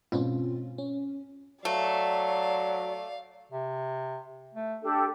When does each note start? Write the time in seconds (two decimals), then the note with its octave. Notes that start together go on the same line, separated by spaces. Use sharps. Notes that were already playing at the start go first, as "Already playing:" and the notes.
0.12 G#2 B2 C4 C#4 F4
0.78 C#4
1.65 F#3 A3 D5 F5
3.51 C3
4.54 A3
4.83 D4 G4 A4